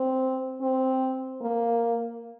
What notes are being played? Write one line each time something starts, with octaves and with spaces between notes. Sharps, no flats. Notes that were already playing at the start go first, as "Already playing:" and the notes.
Already playing: C4
C4
A#3